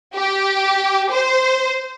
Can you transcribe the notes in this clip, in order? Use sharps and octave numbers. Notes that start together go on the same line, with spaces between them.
G4
C5